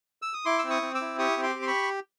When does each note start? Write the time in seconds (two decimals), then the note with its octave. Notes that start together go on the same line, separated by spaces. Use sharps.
0.22 E6
0.33 D#6
0.45 E4 C6 D6
0.59 E6
0.64 C4
0.70 C#6 D#6
0.82 C4
0.94 D6 E6
1.01 E4
1.19 G4 C#6 D#6
1.37 C4
1.43 C6 D6
1.55 G4
1.62 C6
1.67 B5 C#6